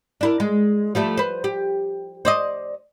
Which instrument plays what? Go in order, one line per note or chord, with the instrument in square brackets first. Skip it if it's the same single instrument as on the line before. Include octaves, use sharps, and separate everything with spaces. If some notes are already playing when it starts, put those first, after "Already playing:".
[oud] D4 E4 A#4
G#3
F3 G3 A3
B4 C5
G4
C5 D5 D#5